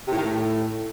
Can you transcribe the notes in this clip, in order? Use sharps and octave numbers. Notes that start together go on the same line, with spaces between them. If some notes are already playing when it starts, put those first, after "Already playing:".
C3
A2
D#3
A2